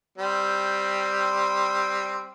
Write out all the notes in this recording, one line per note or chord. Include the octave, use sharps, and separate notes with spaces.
G3 C4